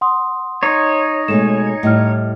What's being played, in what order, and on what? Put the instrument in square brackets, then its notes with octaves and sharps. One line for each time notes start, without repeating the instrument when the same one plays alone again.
[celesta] F#5 C6 D#6
[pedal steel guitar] D#4 C#5
[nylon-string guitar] B2 G#3 A3 [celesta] E7
[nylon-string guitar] A2 G3 [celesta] D#5 F6